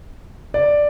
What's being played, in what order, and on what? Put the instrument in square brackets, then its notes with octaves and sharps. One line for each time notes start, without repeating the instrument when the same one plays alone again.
[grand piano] D5